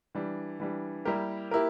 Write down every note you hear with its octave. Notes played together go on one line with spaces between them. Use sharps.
E3 G3 D4
E3 G3 D4
G3 A#3 E4 G4 A#4
A#3 E4 G4 A#4